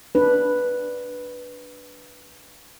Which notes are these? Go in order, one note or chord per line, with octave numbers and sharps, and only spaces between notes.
D4 B4